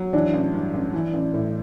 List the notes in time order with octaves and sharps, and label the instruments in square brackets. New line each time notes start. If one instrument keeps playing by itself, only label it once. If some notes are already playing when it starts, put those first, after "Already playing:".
Already playing: [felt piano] F#3
[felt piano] E3 [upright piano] D4
[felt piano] A1
G2
A1
E3
A1
A2